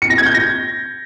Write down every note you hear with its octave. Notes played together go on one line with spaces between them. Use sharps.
C#7
A#6
G#6
G6
A#6